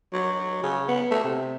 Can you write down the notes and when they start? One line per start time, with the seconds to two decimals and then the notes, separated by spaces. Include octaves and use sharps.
0.13 F#3
0.63 C#3
0.88 B3
1.11 A3
1.24 C3